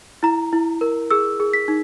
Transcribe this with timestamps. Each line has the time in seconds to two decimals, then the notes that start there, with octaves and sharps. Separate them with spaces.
0.23 E4 A#5
0.53 E4
0.81 A#4
1.10 G#4 E6
1.40 G#4
1.53 B6
1.68 D#4